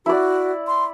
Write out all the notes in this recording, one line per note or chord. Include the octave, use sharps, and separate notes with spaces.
E4 F#4 D5
C6